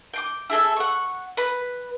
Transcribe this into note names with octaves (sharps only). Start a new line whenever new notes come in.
G5 C6 D6
E4 G#4 A4 E5
F#5 C#6
B4 B5